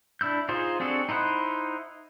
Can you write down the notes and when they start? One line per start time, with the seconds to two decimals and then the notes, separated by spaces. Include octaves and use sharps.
0.21 D4 E4 E6 G6
0.49 D#4 F4 G#4 C5
0.80 C4 D4 F#4 G#4 A4
1.09 D#4 E4 C5 F#5